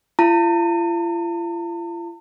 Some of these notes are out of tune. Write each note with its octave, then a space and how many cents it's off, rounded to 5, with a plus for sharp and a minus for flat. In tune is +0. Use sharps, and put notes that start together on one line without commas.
F4 -45 A5 +45